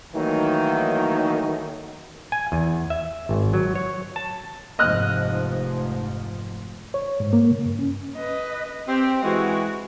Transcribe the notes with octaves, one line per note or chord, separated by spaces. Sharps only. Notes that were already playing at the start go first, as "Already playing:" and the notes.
D#3 E3 F#3 A3 A#3 D#4
G#5
E2
E5
G#1
F#3
C#5
A5
F1 G#2 F3 D#5 F6 F#6
C#5
G#2
A#3
C#3
G2
C#4
B4 D#5
C4 G4
E3 G#3 F#4